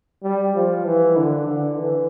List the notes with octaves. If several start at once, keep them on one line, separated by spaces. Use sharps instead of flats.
G3
F3
E3
D3
D3
E3